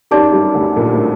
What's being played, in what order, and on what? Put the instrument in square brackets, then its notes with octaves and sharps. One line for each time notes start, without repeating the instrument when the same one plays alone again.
[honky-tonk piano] F#2 F#3 [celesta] D#4 G4 D5 A5 D6
[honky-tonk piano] G2 G3
D2 D3
A#1 A#2
A2